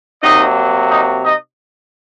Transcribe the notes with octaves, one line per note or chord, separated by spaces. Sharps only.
C3 F#3 A#3 D#4 D#5
D#4 D#5
D#4 D#5